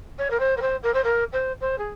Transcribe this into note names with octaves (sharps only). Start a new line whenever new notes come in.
C#5
A#4
C5
A#4
C5
A#4
C5
A#4
C5
C5
G#4